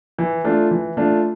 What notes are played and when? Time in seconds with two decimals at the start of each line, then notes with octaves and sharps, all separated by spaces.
0.18 E3
0.44 A3 D4 F4
0.71 E3
0.97 A3 D4 F4